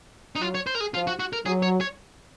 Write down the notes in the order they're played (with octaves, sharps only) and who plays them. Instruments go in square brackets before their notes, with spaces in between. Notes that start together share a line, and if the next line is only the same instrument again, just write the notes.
[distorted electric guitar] D#4
[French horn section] F#3 [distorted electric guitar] F4
[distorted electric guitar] C#5
C5
A#4
G#4
[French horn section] F3 [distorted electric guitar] F4
[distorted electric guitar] F#4
F#4
A#4
[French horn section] F#3 [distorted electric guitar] G#4
[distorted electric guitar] C#5
C#5